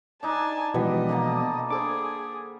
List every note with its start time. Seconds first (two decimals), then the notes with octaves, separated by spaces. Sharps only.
0.23 D4 D#4 G#5 A5
0.74 B2 E3 F3 G3 G#3 B3 D#5
1.09 D3 A#3 A5
1.70 D4 G#4 A4 C5 D6